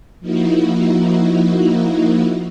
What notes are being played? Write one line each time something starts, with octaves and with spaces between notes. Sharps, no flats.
F3 A#3 D#4 E4 F#4